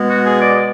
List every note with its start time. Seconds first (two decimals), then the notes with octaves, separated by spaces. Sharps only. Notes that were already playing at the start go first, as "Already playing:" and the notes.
Already playing: B2 G#3 B3
0.10 F#4
0.25 G#4
0.40 D5